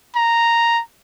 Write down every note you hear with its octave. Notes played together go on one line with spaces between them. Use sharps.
A#5